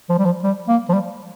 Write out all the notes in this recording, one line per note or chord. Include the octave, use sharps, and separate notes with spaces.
F3
G3
F3
G3
A#3
F3
G3